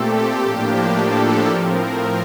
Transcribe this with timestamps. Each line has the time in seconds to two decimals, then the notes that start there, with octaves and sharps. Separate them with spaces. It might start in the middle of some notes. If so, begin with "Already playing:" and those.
Already playing: A#2 A3 C4 G4 A4
0.42 A2 F3 A#3 D4
0.96 A4
1.49 A2 F3 C4 A#4